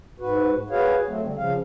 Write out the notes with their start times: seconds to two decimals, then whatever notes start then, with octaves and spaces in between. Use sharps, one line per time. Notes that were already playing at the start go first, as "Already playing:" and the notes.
0.20 G#2 F#4 B4
0.70 F#4 G#4 B4 C#5 F5
1.07 F#3 A3 C4
1.23 D3 G3
1.37 C#3 F3 F5